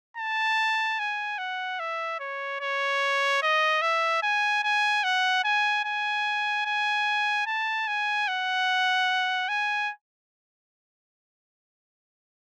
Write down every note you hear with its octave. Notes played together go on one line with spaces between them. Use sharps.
A5
G#5
F#5
E5
C#5
C#5
D#5
E5
G#5
G#5
F#5
G#5
G#5
G#5
A5
G#5
F#5
G#5